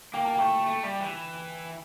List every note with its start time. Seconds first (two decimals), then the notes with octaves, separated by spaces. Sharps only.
0.14 A#3 G5
0.25 A5
0.35 A3 G5
0.66 A3
0.83 G3
1.00 E3